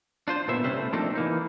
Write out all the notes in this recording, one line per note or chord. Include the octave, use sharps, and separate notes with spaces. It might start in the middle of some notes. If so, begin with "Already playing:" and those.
D4 F4 C5
A#2 D3 B3 C5 E5
C3 G3 C4 C#4 B4 C5
A3
F3 A3 A#3 C4 D4 D#4
E3 A#3 D#4